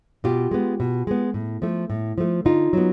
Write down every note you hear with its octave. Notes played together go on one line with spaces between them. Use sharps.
B2 F4 G4
G#3 B3
B2
G#3 B3
A2
F3 A3
A2
F3 A3
D3 D#4 F4
F#3 B3